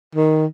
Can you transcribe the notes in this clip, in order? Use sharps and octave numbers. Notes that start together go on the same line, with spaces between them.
D#3